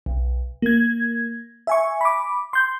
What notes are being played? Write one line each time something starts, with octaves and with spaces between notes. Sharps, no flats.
B1
A#3 G#6
E5 G#5 C#6
B5 D6
C6 G6